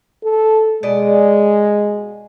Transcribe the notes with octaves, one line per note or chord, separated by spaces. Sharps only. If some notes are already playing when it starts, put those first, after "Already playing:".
A4
B2 G#3 D5 D#5